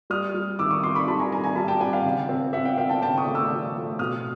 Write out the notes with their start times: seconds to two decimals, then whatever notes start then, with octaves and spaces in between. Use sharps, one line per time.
0.10 G3 D#6 F6
0.34 G3
0.59 D#3 D6 E6
0.71 C#6 D#6
0.83 D#4 C6 D6
0.95 B5 C#6
1.07 G3 A5 B5
1.19 G#5 A#5
1.32 D#3 G#5 A#5
1.44 G#5 A#5
1.56 G3 A5 B5
1.68 G5 A5
1.80 C4 F#5 G#5
1.93 F5 G5
2.05 C#3
2.29 C4
2.53 C4 E5 F#5
2.65 F5 G5
2.77 C4 F5 G5
2.89 G5 A5
3.02 C#3 G5 A5
3.18 C#6 D#6
3.27 A3
3.35 D6 E6
3.50 F3
3.75 A3
3.99 B2 D#6 F6